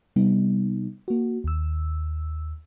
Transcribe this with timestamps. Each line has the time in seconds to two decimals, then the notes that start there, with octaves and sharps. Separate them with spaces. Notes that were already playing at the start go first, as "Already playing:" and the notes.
0.16 C3 G3 B3 D#4
1.08 A#3 F#4
1.44 D#2 E6